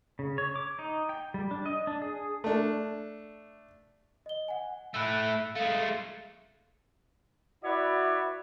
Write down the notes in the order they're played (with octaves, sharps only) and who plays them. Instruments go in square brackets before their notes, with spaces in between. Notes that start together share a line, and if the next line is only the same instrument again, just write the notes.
[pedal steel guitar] C#3
C#5
D6
D#4
G5
G3
D4
D#5
D4
G#4
[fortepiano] A3 D4
[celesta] D#5 G7
F#5 G#5
[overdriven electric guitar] A3 E4 [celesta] E6 F#6
[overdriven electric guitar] G#3 A3 [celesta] F5
[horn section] E4 F#4 B4 C#5 D5 E5